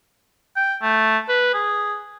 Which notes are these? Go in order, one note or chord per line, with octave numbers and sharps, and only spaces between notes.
G5
A3
B4
G#4